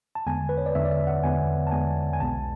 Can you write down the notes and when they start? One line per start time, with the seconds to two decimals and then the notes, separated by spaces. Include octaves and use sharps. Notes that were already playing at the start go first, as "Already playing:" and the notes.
0.15 A5
0.27 E2 D3 G#3 B3 G#5
0.49 B4
0.58 C#5
0.66 D5
0.75 E2 D3 G#3 B3 E5
0.85 D5
0.91 E5
1.07 F#5
1.23 E2 D3 G#3 B3 G#5
1.67 A5
1.71 E2 D3 G#3 B3 G#5
2.13 G#5
2.20 B1 B2 G#3 B3 A5